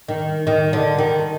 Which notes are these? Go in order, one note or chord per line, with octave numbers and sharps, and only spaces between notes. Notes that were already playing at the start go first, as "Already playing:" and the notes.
D#3
D#3
D3
D#3